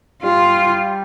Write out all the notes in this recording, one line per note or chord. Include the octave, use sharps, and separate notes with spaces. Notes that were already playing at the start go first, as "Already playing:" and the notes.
G3 F4